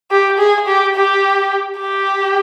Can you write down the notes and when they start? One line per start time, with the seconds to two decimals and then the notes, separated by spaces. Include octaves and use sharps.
0.11 G4
0.39 G#4
0.67 G4
0.95 G4
1.79 G4